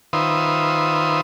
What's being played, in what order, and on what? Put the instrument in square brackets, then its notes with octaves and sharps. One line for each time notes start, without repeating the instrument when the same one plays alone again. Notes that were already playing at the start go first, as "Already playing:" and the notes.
[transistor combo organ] D#3 F4 B4 C5 E5 D#6